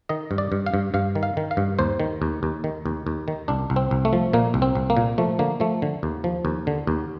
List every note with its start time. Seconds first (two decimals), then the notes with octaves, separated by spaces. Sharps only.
0.09 D#3 D#5
0.31 G2
0.38 D5
0.52 G2
0.66 F5
0.74 G2
0.94 G2 F5
1.15 D#3
1.23 F5
1.37 D#3
1.51 F5
1.57 G2
1.79 D#2 C5
2.00 D#3
2.22 D#2
2.43 D#2
2.64 D#3
2.86 D#2
3.07 D#2
3.28 D#3
3.48 C2 D4
3.70 C2
3.76 C4
3.91 C2
4.05 A3
4.13 F3
4.33 A#2 A#3
4.54 C2
4.62 C4
4.75 C2
4.90 A#3
4.97 A#2
5.18 F3 A3
5.39 D3 A#3
5.60 F3 A3
5.82 D3
6.03 D#2
6.24 F3
6.45 D#2
6.67 D3
6.87 D#2